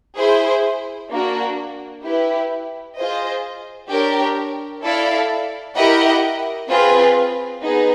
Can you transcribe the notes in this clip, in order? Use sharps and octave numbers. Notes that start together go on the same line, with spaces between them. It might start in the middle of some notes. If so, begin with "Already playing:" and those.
E4 G#4 C5
A#3 D4 F#4
E4 G4 B4
F4 G#4 C5 D#5
D4 G4 A#4 C#5
E4 A4 D5 F5
E4 G4 A#4 D#5 F#5
C4 F4 G#4 B4
B3 D#4 G#4